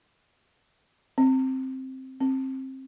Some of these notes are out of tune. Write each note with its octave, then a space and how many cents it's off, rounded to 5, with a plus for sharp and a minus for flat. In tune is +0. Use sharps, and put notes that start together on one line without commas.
C4 +5
C4 +20